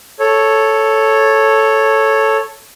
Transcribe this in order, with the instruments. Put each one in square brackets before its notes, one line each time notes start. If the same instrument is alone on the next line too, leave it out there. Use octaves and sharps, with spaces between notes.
[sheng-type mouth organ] A4 C#5